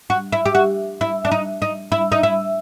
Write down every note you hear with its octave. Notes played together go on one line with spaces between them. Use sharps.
F#4
E4
G4
F#4
E4
D4
D#4
D#4
E4
D#4
E4